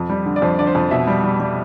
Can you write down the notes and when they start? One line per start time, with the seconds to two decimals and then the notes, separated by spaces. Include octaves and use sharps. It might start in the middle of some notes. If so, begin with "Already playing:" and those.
Already playing: F2
0.10 G3
0.26 D3
0.36 D5
0.42 F2 C5
0.59 D3 D5
0.67 C5
0.75 F2
0.91 B2 E5
1.07 G3
1.24 G3
1.40 G3